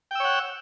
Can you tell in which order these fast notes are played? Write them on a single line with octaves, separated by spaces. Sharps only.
G5 E6 C#5 F#5